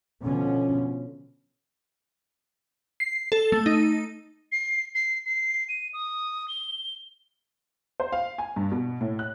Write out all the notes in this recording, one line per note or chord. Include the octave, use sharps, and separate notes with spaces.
B2 D3 F3 C#4
C7
A4
A3
D#4
C7
C7
C7
D#7
D#6
G7
C5
F5
G#5
G2
B2
A2
F#6